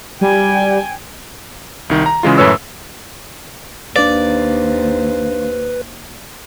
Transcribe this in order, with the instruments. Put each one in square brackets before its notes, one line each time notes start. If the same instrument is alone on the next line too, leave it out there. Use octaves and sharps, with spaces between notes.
[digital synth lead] G3 [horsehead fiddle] G5 G#5
[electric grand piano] C2 D#3
A#5
C#3 E3 G#3 F4
F#2 A2 B4 C#5 E6
[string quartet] D#2 C5 [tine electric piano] D4 F5 [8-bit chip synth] B4 [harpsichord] D5